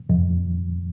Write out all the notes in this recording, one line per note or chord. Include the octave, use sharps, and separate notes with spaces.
F2